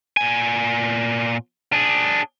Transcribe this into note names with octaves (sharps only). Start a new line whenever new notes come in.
A#2 G#5
D4 G#4